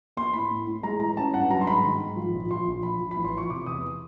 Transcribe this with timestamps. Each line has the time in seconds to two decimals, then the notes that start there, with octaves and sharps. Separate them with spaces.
0.17 A#3 C6
0.33 A2 B5
0.51 A2
0.67 A2
0.83 G#3 A#5
1.00 E3 A#5
1.17 C#4 A5
1.34 G2 F#5
1.50 F#3 A#5
1.61 C6
1.67 G#2 B5
1.84 D#3
2.01 G#2
2.16 F3
2.33 A#1
2.51 F3 C6
2.67 A#1
2.83 F3 B5
3.01 F3
3.11 B5
3.16 A1
3.25 C6
3.34 F3 C#6
3.50 C3 D6
3.66 E2 D#6